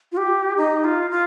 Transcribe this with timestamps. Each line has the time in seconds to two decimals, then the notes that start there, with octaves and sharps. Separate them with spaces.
0.12 F4
0.17 G4
0.57 D#4
0.84 F4
1.11 F4